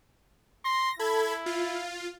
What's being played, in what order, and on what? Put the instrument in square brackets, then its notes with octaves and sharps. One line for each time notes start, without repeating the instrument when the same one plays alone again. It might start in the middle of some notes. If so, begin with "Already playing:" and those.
[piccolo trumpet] C6 [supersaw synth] A#6
[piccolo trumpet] E4 [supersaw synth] A4 B5 G#6
[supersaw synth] F4